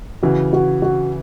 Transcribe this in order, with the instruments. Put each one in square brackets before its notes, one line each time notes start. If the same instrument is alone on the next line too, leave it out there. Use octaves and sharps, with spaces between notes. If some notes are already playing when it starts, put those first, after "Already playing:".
[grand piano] C#3 E3 [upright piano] F#4
[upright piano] F#4
F#4